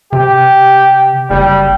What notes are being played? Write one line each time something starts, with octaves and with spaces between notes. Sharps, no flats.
C3 G4
F#1 G3